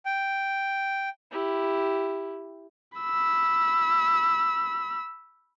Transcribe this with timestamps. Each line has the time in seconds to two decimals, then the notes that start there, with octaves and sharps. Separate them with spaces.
0.05 G5
1.32 E4 G4
2.98 B5 E6